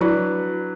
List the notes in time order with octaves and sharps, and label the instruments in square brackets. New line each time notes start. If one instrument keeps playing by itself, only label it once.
[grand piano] F#3 D4 B4 D5 [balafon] E4